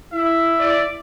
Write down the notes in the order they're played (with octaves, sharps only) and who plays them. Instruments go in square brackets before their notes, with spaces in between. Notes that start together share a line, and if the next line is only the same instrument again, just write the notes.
[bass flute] E4 [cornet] E5
[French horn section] D5